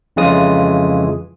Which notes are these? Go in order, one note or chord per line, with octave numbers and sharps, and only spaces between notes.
F2 C#3 E3 G#3 F4 D#6